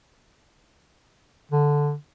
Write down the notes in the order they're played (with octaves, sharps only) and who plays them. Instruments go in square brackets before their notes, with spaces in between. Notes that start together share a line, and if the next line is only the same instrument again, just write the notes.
[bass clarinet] D3